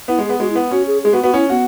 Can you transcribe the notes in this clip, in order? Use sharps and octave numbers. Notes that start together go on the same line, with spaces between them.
B3 E4
G#3
G#4
B3
G#3 F#4
E4
B3
C#4 F#4
G#4
G#3 G#4
B3 F#4
B3 F#4
C#4 E4
B3 F#4